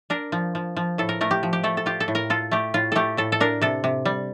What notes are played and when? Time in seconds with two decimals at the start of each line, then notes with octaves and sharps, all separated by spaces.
0.10 D4 A#4
0.32 F3
0.55 F3
0.77 F3
0.98 A2 A4
1.09 A#4
1.21 A3 A#4
1.31 G4
1.43 F3
1.53 G4
1.63 A3 A4
1.77 A4
1.86 F4 G4
2.00 A4
2.08 A2
2.15 A#4
2.30 F4 A4
2.52 A3 G4
2.74 A2 F4
2.92 A3 G4 A4
3.17 A2 A4
3.32 A4
3.40 D4 A#4
3.62 C3 A4
3.84 C3
4.05 G3